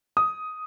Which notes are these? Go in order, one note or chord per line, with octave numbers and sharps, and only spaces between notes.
D#6